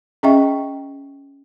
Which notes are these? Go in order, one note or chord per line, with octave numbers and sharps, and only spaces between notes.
C#4 G#4 D#5 E5 G5 C#6